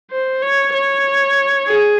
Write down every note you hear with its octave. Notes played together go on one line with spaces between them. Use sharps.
C5
C#5
C#5
G#4